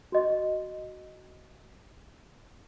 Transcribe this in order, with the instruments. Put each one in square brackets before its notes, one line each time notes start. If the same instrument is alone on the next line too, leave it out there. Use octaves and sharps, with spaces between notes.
[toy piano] F#4 D#5 C#6